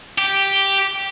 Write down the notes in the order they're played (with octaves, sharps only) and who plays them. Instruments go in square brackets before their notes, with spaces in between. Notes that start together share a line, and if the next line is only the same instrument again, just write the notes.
[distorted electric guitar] G4